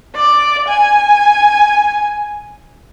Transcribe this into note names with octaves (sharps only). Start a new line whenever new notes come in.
D5
G#5